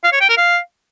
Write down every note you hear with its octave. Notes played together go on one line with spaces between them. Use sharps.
F5
C#5
G5
A#4
F5